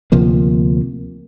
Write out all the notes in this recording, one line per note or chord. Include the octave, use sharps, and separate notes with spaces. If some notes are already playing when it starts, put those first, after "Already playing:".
D2 C3 F3 A#3